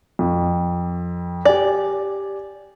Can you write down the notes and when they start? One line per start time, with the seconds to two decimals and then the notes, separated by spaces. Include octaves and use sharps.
0.19 F2
1.45 G4 D5 G#5